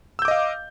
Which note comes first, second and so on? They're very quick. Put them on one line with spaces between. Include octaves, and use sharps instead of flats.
E6 G6 D6 D#5 F5